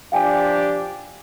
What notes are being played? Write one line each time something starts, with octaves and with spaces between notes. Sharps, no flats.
F3 D4 G4 F5 G5 G#5